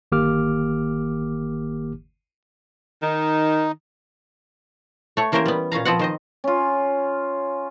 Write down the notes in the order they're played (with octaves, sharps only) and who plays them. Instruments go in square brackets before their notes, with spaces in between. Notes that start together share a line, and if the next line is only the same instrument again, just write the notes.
[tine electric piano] G1 D#3 A#3 G4 D6 F6
[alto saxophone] D#3 [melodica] D#4
[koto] A3 C#5
E3 A#3 C#4 G4 A#4 C5
G3 B3
A#2 C#4 F5 A#5
F3 B3 C4 F#5
D#3 C5 D#5
[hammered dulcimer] C#4 F4